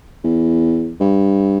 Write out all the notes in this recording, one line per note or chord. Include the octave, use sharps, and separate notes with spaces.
E2
G2